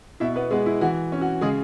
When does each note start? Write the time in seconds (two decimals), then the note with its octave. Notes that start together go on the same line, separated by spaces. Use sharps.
0.20 B2 E4 E5
0.36 B3 B4
0.51 G#3 B3 G#4
0.66 E4
0.81 E3 F#4
1.12 C#4
1.21 F#4
1.41 C#3 G#3 G#4